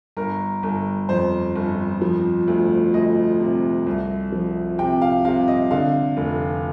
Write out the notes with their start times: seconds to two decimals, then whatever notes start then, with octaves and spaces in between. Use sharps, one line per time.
0.17 G1 A#4
0.63 G1
1.09 F2 C5
1.56 G1
2.02 F3
2.48 D2
2.94 D2 D#5
3.40 C3
3.87 C2
4.32 F3
4.78 C3 G5
5.01 F5
5.25 C3 F5
5.48 D#5
5.71 D3 F5
6.17 F1